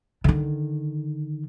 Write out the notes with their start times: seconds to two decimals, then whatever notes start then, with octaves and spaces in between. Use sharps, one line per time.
0.24 D3 D#3